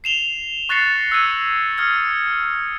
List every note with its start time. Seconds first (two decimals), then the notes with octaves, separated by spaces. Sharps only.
0.04 C7 E7 F7 G7
0.69 C#6 F#6 A6 A#6 C7 C#7
1.12 E6 F#6 G#6 D#7
1.78 D#6 F6 G#6 C#7